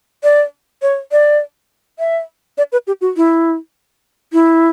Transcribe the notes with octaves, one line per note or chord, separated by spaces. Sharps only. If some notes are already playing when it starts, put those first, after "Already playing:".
D5
C#5
D5
E5
D5
B4
G4
F#4
E4
E4